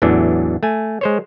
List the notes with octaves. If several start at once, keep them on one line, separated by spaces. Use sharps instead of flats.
A1 E2 E3 F#3 D4
A3 G#5
G#3 C5 C#5